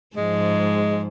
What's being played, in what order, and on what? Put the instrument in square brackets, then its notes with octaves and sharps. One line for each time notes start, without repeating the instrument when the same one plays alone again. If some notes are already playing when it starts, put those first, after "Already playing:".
[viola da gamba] G#2 F3 [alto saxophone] G#3